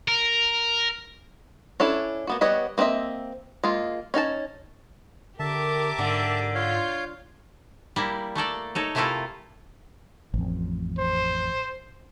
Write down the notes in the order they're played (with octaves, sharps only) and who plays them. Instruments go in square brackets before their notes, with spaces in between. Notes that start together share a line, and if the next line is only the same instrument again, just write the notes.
[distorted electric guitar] A#4
[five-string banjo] C#4 D4 E4 A4
A#3 B3 F#4
G3 B3 B4 C#5 D#5
A#3 C4 F#4 D#5 E5
G#3 A#3 F4
C#4 D#4 G#5 A5
[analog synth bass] D3 [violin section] G4 A#4 D6 [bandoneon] E5 A5
[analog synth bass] G#2 [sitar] D3
[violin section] F4 G6 [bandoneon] C#5 F5
[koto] G3 A#3 E4
A3 A#3 A4 D5
D#4 A4 C#5
C3 A3 A#3 E4 F4 A4
[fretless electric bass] A1 F2
[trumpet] C5